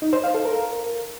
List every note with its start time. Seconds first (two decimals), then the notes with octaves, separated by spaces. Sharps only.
0.02 D#4
0.13 C5
0.24 F5
0.34 A4
0.45 A#4